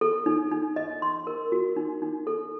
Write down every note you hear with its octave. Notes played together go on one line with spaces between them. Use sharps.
A4
D#4
D#4
D#5
C6
A#4
F#4
D#4
D#4
A4